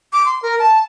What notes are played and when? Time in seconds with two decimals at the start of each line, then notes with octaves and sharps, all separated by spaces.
0.13 D6
0.26 C6
0.42 A#4
0.59 A5